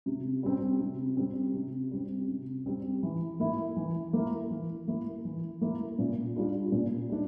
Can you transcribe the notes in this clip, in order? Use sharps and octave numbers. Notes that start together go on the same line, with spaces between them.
C3
G3 C4
C3
G3 C4
C3
G3 C4
C3
G3 C4
E3
A#3 E4
E3
A#3 E4
E3
A#3 E4
E3
A#3 E4
A#2
G3 D4 F4
A#2
G3 D4